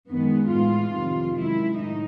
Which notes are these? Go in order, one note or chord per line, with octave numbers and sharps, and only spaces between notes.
F#2 D#3 G#3 B3
A2 E3 G#3 F4
F2 C3 D#3 F#3
F#2 D#3 G#3 E4
A2 D#4